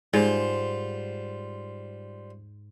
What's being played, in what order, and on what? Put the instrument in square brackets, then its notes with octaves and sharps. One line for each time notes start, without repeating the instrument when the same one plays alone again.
[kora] G#2 [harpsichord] G3 F4 C5